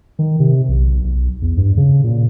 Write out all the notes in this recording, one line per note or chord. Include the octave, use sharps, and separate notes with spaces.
D#3
C3
B1
B1
E2
G2
C#3
A#2